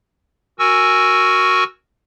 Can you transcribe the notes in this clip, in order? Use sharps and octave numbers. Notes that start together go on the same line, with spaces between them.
F#4 A#4 G#5 C#6 E6